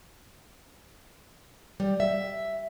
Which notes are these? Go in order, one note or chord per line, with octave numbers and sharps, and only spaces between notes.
G3
E5